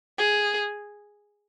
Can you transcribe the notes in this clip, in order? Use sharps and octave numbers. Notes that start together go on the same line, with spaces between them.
G#4